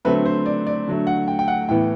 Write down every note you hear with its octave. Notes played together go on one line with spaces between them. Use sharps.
D3 F#3 A3 C4 B4
C5
D5
D5
D3 F#3 A3
F#5
G5
G5
F#5
A2 E3 B3 G5